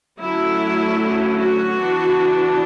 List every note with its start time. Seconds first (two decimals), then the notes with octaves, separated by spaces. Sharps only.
0.21 D3 F#3 A3 C#4 E4
1.38 F#4
1.77 E3 B3 D4